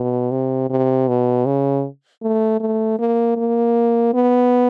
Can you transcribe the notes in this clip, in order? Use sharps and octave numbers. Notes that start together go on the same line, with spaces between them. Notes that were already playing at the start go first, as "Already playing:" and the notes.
Already playing: B2
C3
C3
B2
C#3
A3
A3
A#3
A#3
B3